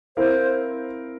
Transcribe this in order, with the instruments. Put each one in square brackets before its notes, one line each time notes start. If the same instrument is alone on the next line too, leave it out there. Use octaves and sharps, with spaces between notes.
[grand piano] C4 E4 A#4 F5 [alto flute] C5